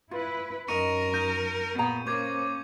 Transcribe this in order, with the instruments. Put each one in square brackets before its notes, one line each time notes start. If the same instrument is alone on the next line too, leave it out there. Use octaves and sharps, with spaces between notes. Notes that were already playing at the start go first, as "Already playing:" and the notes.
[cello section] E4 B4 [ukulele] F4
[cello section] F#2 [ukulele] D#4 D#5 [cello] A#4 [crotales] C#6 C#7 D#7
[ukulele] D#4 [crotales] C#6 G6 D#7
[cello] A#2 B3 [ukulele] G#4 G5 A#5
[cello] A#3 [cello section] C#4 [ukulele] A#4 C5 [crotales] C#6 D6 G#6